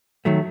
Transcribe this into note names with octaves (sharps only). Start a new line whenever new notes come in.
D#3 F#3 A3